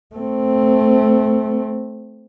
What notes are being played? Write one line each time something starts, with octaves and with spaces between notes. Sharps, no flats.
A3 C4